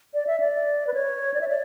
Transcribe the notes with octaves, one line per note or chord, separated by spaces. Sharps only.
D5
E5
D5
B4
C#5
D5
E5
D5